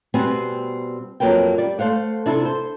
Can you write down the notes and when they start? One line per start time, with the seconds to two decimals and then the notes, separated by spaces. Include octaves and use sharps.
0.14 B2 G3 B3 C4 F#5 G#5
1.20 F2 F#3 A#3 B4 G5
1.58 G3 D5
1.79 A3 C5 F5 F#5
2.26 C3 D4 E4 A4
2.45 C5